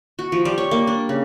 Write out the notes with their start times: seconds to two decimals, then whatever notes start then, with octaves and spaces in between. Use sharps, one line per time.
0.19 F#4
0.32 F3
0.45 G3
0.58 C#5
0.71 A#3
0.87 D4
1.09 C#3